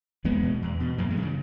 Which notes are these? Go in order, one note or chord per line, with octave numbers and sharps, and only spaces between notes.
E2 G#3 B3
B2
E2
B2
F#2 F#3 A#3
E3 G#3
C#3
D#3 F#3